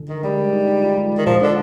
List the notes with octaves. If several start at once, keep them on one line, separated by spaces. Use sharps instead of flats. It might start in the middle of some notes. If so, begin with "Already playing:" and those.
Already playing: D3
D#3 A#4
G3 G#3
G#3
D#4
D#4
F4
G#3
G#3
D#3
A#2 F3
D3 D4